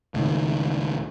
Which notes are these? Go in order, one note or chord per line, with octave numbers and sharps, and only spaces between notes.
C#2 A2 D#3